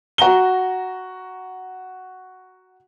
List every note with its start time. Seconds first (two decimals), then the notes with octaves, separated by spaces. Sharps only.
0.18 F#4 A#5 G7